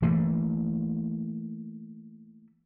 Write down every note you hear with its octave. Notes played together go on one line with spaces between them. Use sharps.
E3 A3 A#3